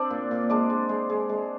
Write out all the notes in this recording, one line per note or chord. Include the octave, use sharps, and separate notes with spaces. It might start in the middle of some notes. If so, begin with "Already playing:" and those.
Already playing: C4 D4 C5 D5
A#2
A#2
G#3 D4 D5
G#3
G#3
G#3
G#3